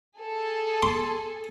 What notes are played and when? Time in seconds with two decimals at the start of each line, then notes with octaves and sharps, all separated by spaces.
0.18 G#4 A4
0.83 C6